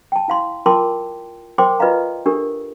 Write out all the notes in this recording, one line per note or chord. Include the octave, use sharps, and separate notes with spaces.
G5 A5
E4 F5 C6
F4 A#4 G5 A5 C6 D6
A#4 C5 G5 C6 D6
F4 B4 D5 D#5 F5 A#5
D4 G4 A4 A#4